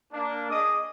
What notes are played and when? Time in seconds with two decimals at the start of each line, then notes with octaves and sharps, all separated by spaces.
0.13 A#3 D4
0.50 G#4 D#5 D6 D#6